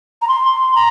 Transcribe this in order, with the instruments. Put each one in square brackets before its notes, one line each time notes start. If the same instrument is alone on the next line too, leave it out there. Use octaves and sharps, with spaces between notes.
[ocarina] A#5
C6
A#5